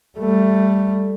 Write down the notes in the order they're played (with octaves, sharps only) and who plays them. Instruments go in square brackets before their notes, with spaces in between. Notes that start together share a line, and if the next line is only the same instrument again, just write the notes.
[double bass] G3 A3